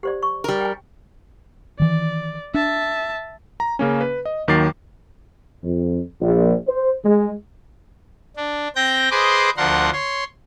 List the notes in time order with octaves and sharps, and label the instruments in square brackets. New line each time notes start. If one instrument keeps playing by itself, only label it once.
[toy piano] G4 C5 D5
C#6
[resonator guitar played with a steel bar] G3 A#4
[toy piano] G5 G#5
[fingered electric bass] D#3 E3 [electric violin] D5
[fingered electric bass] D4 [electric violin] E5 A5
[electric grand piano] A#5
C#3 A#3 C#4
B4
D#5
D#2 D#3 F#3 D6 A6 C7
[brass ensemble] F2
A#1
C5
G#3
[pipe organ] D4
C4 G5 G6 A#6
G#4 B4 C5 D#5 C6 D6
D2 F3 D4 A#4 F#5 C6
C#5 C6